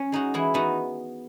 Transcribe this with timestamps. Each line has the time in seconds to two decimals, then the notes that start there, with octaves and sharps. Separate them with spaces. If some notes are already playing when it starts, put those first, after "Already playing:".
Already playing: C#4
0.12 G#3 D#4 F#4
0.34 E3 E4 G#4
0.54 B3 D#4 F#4